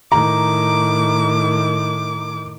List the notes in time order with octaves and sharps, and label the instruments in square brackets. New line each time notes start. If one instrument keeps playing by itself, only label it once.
[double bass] A2 D#3 [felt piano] A#5 [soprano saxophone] D6